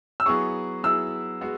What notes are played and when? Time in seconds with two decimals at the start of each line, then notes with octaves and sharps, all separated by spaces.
0.20 E6
0.26 F#3 B3 E4 G#4 C#6
0.83 F#3 B3 E4 G#4 E6
1.41 G#3 B3 F#4